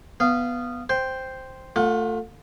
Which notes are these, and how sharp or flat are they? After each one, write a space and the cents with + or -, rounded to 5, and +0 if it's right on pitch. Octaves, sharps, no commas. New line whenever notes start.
B3 +0 F5 -20
C5 +0 G5 +0
A3 +20 F4 +30 F#5 -5